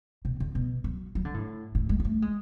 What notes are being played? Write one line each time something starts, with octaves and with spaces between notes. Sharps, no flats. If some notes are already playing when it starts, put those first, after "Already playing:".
B2
D3
B2
F#3
F#3
D3
A2
A2
G#3
G#3
A3
G#3